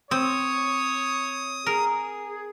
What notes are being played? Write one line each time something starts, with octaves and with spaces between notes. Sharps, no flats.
C4 C#5 D#6
G#4 A#4